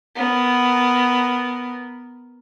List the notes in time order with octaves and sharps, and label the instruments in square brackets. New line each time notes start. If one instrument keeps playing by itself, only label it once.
[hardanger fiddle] B3 A#4